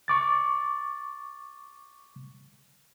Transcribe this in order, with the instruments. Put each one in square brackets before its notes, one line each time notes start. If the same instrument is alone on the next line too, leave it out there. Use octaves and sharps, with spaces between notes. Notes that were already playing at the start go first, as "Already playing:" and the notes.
[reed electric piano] C#6 D6 A6